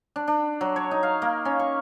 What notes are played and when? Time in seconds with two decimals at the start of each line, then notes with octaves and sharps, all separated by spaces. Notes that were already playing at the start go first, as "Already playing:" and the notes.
0.16 D4
0.28 D4
0.61 F#3
0.76 C#5
0.91 D#4
1.03 F5
1.22 A#3
1.45 C#4
1.60 C#6